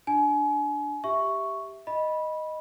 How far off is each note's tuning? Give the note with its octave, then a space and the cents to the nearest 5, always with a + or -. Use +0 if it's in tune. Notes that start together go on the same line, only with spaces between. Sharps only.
D4 +0 G#5 +30
G4 +0 E5 +0 C#6 +0
D#5 +0 B5 -15